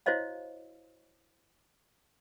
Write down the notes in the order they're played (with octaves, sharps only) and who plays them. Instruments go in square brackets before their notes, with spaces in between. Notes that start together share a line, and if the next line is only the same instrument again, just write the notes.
[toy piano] E4 F#4 C5 C#5 D#5 F5